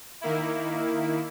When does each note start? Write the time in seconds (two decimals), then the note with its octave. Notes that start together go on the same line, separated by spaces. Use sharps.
0.21 D#3 A#3 E4